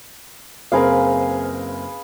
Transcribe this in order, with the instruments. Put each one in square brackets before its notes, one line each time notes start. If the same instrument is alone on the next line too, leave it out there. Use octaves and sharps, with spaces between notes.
[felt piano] F#1 C4 A#4 [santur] G#4 B4 F5